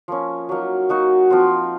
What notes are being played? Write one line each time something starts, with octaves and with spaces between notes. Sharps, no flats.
F3 A#3 C#4
F#3 A#3 D#4
A#3 D#4 F#4
F3 C4 F4